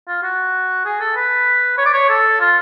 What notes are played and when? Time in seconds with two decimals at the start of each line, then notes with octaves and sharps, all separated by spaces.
0.08 F4
0.23 F#4
0.86 G#4
1.00 A4
1.16 B4
1.78 C#5
1.86 D5
1.94 C#5
2.09 A4
2.41 F4